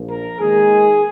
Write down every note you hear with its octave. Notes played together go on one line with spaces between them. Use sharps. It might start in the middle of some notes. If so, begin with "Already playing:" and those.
Already playing: A#1 A#2 F3
A#4
D#2 D#3 G#3 G#4